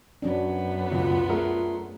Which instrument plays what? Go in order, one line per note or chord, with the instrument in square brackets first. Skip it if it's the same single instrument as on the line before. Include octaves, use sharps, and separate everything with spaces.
[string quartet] F#2 B3 [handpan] F#3 C#4 D4
[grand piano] C#2 B2 [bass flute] F4
[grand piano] A3 G#4 A#4 [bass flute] F4